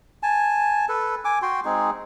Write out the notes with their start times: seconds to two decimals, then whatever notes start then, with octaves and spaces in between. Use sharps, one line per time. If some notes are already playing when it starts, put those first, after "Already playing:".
0.23 G#5 A5
0.89 A4 B4
1.25 G#5 D6
1.42 F#4 G5 C6
1.65 G#3 C4 D#4 G#4